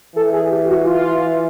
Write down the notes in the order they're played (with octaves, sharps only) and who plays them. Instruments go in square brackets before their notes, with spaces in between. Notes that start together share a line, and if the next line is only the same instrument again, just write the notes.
[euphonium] E3 [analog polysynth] A4
[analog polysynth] G#4
G4
F#4
F4